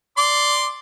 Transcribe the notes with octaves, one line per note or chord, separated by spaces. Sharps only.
D5 C6 D6